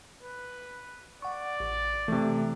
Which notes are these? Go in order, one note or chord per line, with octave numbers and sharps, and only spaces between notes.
B4
D5 F#5 C#6
A1
C3 E3 A3